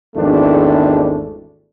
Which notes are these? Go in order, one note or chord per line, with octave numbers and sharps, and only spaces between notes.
G#1 E2 A3 D4